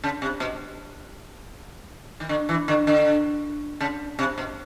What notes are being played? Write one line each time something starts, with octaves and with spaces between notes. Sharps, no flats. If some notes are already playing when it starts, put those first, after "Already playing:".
C#3
C3
B2
D#3
D3
E3
D3
D3
C#3
C3
B2